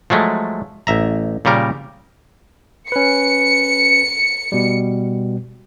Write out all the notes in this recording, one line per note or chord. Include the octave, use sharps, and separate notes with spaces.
F3 F#3 G#3 A3
A1 E5 A#5
A#2 C#3 G3 A#4
C#4 B4 C#7
B2 G3